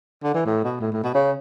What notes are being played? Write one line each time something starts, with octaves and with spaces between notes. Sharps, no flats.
D3
E3
A2
B2
A2
A2
B2
C#3